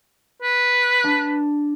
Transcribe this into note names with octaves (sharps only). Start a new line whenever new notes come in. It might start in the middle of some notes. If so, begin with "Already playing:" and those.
B4
D4